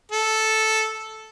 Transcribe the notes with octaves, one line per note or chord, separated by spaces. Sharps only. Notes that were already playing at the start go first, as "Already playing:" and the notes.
A4